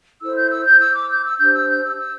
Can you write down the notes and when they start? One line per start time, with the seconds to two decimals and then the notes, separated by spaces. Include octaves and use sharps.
0.21 E4 A4 C5 E6
0.36 G6
0.50 E6
0.65 G6
0.81 E6
0.94 D6
1.10 G6
1.25 E6
1.39 D4 G4 C5 G6
1.54 E6
1.68 G6
1.84 E6
1.98 E6